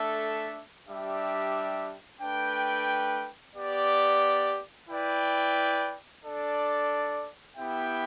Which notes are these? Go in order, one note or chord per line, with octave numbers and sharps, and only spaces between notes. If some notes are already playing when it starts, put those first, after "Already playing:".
Already playing: A3 D4 A4 E5
G3 D4 G4 E5
A3 D4 B4 G5
B3 G4 D5
E4 B4 D5 G5
D4 A4 D5
B3 E4 G4 E5 G5